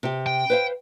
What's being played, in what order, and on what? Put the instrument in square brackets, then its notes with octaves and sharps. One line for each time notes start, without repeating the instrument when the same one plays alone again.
[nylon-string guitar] C3 G4
[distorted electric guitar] G5
[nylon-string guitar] B4 C5 F5